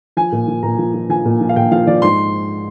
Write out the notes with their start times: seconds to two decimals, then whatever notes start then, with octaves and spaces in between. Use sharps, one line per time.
0.17 F3 G#5
0.32 A#2
0.48 F3
0.63 A#2 A#5
0.78 F3
0.94 F3
1.09 F3 G#5
1.25 A#2
1.41 F3
1.49 F5
1.56 A#2 G5
1.71 F3 F5
1.87 F3 D5
2.02 G#2 C6